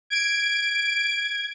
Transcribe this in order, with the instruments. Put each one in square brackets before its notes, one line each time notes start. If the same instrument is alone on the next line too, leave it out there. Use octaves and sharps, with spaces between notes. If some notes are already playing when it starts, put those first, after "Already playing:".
[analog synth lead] G#6 [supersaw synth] D7